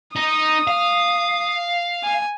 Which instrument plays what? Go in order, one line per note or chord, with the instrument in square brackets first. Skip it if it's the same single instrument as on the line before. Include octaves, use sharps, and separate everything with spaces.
[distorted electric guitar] D#4 [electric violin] D#6
[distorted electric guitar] F5
[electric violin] G#5